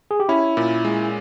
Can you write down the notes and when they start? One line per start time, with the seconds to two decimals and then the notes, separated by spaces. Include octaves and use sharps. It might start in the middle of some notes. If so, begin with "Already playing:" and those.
0.11 G#4
0.20 G4
0.29 C#4 E4
0.57 A#2
0.85 G#3